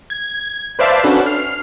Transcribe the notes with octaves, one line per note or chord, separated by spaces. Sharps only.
G#6
B4 C5 D5 E5 F5 A5
C#4 D4 F#4 A4 B4
F6 C7